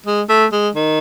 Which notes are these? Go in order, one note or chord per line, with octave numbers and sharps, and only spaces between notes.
G#3
A3
G#3
D#3